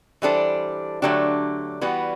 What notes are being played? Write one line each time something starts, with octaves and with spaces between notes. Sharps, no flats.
E3 G3 D4 A4 C5
D3 F#3 A3 D4 G4
E3 G3 B3 F#4